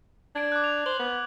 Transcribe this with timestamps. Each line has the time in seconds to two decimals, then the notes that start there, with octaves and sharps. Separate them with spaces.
0.35 D4 G#6 D7
0.52 D6 F#6
0.64 F7
0.86 C5 F#7
1.00 B3